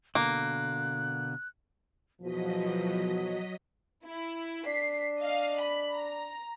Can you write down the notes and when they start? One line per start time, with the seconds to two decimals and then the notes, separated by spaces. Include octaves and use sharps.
0.15 B2 D3 A#3 F#6
2.21 E2 B2 F3 F#3 F#4 D#5 B6
4.05 E4
4.66 D4 B6 C7
5.19 D#5 F5
5.60 B5
5.95 A#5